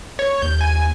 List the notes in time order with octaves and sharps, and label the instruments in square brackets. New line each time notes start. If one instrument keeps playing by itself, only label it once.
[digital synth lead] C#5
[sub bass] D#2 [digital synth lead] G6
[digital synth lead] G#5